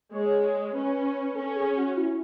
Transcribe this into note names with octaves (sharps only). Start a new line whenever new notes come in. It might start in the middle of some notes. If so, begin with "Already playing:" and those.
G#3 C#5
C#4 B4
C#4 A4
G#4
F#4
E4